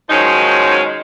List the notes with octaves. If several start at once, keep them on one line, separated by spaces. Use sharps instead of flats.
D#3 F3 F#3 G#3 C#4 D#4